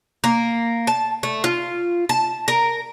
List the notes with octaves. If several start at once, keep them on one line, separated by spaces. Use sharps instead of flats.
A#3
A5
A3
F4
A5
A#4